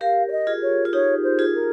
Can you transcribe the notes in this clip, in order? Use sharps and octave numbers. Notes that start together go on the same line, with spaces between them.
G4 A#4 F5
C#5
D#5
F4 G#4
C#5
F4
D#4 G4 C#5
C5
F4 G#4
A#4